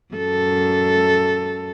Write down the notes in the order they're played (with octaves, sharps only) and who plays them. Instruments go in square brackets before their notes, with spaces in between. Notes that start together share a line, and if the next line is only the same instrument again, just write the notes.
[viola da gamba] F#2 A4